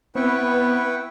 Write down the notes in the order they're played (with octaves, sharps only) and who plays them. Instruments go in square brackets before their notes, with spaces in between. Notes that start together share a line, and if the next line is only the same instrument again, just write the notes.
[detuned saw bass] B3 [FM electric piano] C4 [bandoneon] E4 [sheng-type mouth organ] B4 G5 C#6